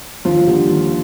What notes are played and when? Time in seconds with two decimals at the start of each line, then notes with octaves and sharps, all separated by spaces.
0.25 D#2 F3 F4
0.47 D3 G3 A#3
0.69 D#2